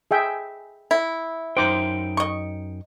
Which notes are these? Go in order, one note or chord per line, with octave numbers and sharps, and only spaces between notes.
G#4 E5 G5
E4
F#2 D#4 C5 G5 D6
D#5 C#6